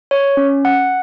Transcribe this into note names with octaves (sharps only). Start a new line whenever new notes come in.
C#5
C#4
F#5